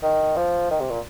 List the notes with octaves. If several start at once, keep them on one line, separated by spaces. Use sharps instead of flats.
D#3
F3
D#3
C3
A#2